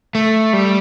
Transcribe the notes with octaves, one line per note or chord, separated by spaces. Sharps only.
A3
G3